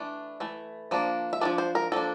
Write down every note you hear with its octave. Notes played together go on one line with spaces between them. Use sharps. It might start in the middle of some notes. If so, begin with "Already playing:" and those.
Already playing: E3 A3 D4
E3 A3
F3 A#3 D4
E5
F3 A#3 D4 D5
C5
A#4
F3 A#3 D4 A4